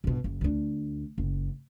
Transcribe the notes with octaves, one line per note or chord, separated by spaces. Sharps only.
G1 B2
F#1
D2 D4
F#1